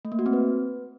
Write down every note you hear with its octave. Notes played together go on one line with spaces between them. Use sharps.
A3
A#3
F#4
C4
B4